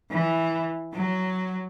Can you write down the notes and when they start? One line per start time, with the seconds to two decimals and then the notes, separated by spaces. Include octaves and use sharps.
0.11 E3
0.93 F#3